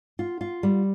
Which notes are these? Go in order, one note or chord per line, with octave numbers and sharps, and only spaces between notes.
F4
F4
G3